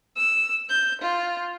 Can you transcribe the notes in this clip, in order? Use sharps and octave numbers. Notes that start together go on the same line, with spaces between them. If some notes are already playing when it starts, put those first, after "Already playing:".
E6
G6
F4